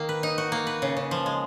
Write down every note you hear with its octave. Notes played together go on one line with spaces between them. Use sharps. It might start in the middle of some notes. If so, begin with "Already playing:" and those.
Already playing: D#3 A#3
B4
D#4
F#4
A#3
B4
C#3
C#3
F3
G#3